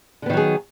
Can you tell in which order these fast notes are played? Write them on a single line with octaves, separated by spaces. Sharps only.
D3 B3 D#3 F#3 G#4